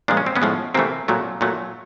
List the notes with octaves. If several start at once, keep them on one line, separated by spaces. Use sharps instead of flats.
A#2 F3 G#3 D4
C#4
C4
B3 C#4
A2 F3 G#3
C3 E3 A3 A#3 C4
A#2 F#3 A3
A#2 F#3 A3